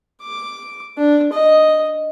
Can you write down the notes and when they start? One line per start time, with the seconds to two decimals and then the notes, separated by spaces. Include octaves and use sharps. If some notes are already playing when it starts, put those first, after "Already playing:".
0.22 D6
0.98 D4
1.32 D#5